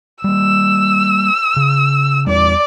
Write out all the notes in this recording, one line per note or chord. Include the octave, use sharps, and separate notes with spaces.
G3 A#3 E6
C#3
E2 G3 D5